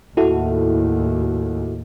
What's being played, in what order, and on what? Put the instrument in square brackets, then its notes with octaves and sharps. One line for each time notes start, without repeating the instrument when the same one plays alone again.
[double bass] D#2 A2 [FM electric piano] E4 F#4 A4